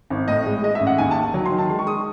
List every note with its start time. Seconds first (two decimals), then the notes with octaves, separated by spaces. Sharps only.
0.10 G#1
0.28 A2 D#5
0.46 G#3
0.63 G#3 D#5
0.75 E5
0.81 A1
0.87 F#5
0.98 D#2 G#5
1.11 A5
1.17 D#3
1.34 F#3
1.46 C6
1.52 D#3
1.59 A5
1.69 G#3 C6
1.79 C#6
1.87 G#3 D#6